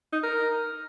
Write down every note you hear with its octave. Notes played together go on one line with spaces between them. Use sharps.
D#4
A#4